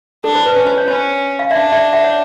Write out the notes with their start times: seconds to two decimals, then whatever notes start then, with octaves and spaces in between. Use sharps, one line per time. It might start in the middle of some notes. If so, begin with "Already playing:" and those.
0.24 D4 A4
0.35 C5
0.46 B4
0.56 C#4
0.67 C5
0.78 C#5
0.88 C#4 C5
1.39 F5
1.51 D4 D5 E5
1.72 D5 E5
1.93 E5 F#5
2.04 C#5